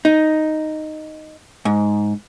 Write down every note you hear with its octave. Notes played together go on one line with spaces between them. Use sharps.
D#4
G#2